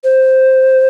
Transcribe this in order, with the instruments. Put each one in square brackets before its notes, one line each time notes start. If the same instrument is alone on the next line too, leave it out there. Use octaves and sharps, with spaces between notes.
[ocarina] C5